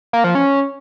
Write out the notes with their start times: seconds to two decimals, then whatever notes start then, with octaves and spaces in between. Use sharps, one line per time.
0.13 A#3
0.24 F3
0.35 C#4